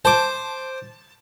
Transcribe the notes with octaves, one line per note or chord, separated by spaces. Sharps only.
C5 A5 D6